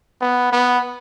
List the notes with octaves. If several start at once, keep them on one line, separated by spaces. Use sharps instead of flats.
B3
B3